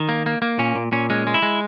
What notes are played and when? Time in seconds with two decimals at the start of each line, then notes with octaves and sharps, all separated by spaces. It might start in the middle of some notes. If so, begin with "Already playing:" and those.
Already playing: D#3 D#4
0.09 A#3
0.26 A#3
0.42 A#3
0.59 A#2 C#4
0.75 A#2
0.92 A#2 C#4
1.10 G#3 C#4
1.27 G#3
1.34 E4
1.42 G#3